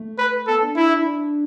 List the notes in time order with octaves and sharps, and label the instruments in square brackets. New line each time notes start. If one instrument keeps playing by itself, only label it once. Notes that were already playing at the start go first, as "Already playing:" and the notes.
Already playing: [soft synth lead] A3
[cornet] B4
[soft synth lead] B3 [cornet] A4
[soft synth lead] D4
[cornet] E4
[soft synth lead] D4